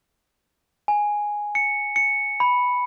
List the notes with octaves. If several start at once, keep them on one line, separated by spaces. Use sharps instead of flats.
G#5
C#7
C#7
B5